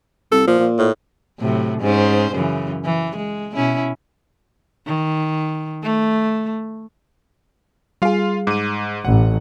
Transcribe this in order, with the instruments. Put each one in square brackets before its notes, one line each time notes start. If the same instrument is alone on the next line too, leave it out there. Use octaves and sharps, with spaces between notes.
[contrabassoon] C2 [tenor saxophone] A4
[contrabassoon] A#2 [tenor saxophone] F3
[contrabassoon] A#2
[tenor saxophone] A2
[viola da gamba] A2 C3 F#3
G#2 C#4 C5
F#2 C#3 E3
E3
G#3
B2 C#4 E4
D#3
A3
[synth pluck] G3 G#4 [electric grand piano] F4 F5
[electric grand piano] G#2 [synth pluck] D6 D#7
[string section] A1 [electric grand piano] F#5